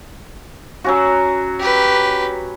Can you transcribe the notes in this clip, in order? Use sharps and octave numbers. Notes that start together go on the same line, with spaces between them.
F#3 C#4 F#4
G4 B4